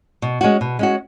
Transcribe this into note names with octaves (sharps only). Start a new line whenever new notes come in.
B2
G#3 C#4 F#4
B2
G#3 C#4 F#4